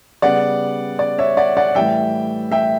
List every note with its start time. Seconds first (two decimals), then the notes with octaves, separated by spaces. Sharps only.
0.22 C#3 G3 B3 D5 F#5
0.99 D5
1.18 C#5 E5
1.37 D5 F#5
1.57 D5 F#5
1.75 A2 E3 G3 E5 G5
2.52 E5 G5